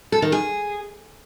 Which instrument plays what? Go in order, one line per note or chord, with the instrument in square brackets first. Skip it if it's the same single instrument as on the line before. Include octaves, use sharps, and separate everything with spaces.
[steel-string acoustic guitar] A4
D#3
G#4